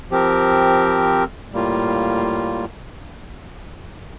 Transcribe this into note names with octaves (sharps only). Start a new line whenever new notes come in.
F3 C4 G4 A#4
A2 G3 A#3 F4